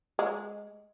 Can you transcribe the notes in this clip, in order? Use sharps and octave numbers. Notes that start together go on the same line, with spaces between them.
G#3